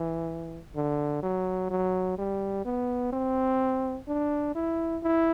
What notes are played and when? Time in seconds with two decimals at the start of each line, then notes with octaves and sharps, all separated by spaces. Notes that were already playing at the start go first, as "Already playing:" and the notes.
Already playing: E3
0.76 D3
1.23 F#3
1.70 F#3
2.18 G3
2.65 B3
3.13 C4
4.08 D4
4.55 E4
5.03 E4